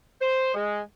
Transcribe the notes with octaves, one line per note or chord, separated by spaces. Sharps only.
C5
G#3